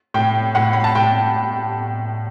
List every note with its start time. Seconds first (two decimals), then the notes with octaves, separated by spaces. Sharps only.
0.14 A2 G5
0.55 A2 F#5
0.73 B5
0.84 A5
0.95 A2 G5